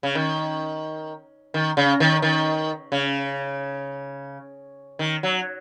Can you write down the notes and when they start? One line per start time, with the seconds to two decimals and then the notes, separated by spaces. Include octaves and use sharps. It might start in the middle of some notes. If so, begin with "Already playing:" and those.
0.03 C#3
0.15 D#3
1.54 D#3
1.77 C#3
2.00 D#3
2.22 D#3
2.92 C#3
4.99 D#3
5.23 F#3